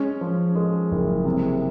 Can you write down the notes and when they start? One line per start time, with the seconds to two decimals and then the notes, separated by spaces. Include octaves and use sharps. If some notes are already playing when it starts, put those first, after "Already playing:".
Already playing: G#3 C#4
0.21 F3
0.55 G#3
0.91 F#1
1.25 C3